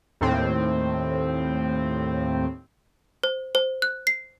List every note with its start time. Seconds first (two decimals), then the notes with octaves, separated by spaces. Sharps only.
0.21 D#2 A2 C4
3.23 C5
3.55 C5
3.82 F#6
4.07 C7